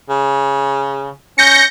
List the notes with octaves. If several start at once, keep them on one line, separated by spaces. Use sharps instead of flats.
C#3
C#4 G6 A#6 C#7